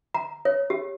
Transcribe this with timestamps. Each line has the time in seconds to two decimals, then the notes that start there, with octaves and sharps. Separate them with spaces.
0.14 A#5
0.45 C#5
0.70 G4